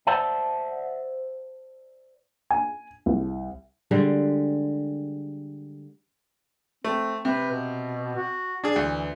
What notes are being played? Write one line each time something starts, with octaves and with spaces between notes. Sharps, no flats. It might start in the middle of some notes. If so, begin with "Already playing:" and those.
C5 D5 E5 F#5 A5
G#5
C2
D3 G3 G#3
A3 C4
C3 B4
B2
F#4
D4 G#4
D2 E3